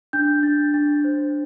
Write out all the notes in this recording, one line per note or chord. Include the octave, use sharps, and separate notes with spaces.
D4 G6
D4 A6
D4 A6
C5